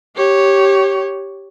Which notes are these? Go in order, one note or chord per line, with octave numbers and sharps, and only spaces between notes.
G4 C#5